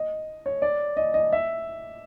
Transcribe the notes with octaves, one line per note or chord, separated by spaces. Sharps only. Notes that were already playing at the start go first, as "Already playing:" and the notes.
Already playing: D#5
C#5
D5
D#5
D#5
E5